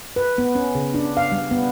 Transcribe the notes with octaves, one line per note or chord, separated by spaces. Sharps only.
B4
B3
C#4
C#3
D4
F5
G3
B3